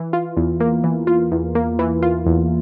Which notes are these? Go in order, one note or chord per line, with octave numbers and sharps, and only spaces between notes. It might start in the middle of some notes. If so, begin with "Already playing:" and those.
Already playing: E3
F4
E2
A#3
E3
F4
E2
A#3
E3
F4
E2